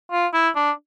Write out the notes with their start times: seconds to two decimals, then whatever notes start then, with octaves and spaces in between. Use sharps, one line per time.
0.12 F4
0.33 E4
0.55 D4